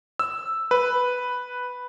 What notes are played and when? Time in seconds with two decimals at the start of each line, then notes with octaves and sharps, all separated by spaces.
0.19 E6
0.71 B4